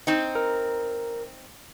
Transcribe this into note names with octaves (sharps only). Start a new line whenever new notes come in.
C4 D#4
A#4